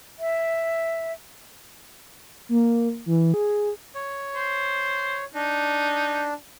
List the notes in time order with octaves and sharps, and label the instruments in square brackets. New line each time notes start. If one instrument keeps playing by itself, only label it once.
[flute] E5
[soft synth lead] A#3
E3
G#4
[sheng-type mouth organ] C#5
[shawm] C5
[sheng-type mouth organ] D4 [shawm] D#4